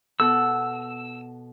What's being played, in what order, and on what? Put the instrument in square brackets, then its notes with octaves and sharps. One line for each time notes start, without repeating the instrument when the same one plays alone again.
[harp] B2 A4 F#5 [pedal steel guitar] E6